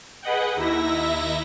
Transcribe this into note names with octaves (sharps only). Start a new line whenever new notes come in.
G#4 B4 D#5 F#5 G5
D#2 D#4 E4 E5 A#6